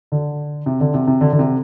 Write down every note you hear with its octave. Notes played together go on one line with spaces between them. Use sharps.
D3
C3
D3
C3
C3
D3
D3
C3